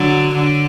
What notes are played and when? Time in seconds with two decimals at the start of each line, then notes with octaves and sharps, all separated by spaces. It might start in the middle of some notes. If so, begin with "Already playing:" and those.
Already playing: D3 F#3
0.34 D3